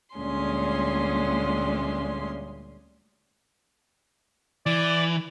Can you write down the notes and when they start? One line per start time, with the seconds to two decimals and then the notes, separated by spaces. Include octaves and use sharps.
0.16 D2 A#2 G3 G#3 C#4 C6
4.66 E3 D5